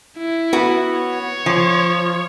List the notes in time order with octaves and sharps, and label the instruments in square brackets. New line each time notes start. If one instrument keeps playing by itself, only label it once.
[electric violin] E4
[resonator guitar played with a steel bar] B3 F#4
[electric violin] C#5
[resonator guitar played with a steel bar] F3